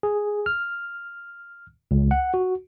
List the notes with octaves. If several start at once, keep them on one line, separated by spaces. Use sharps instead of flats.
G#4
F6
C#2
F#5
F#4